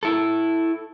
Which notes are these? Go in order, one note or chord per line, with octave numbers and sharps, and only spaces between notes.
E4 A4